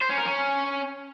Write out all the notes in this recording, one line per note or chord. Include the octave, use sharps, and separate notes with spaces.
C5
C#4
A#4
C#4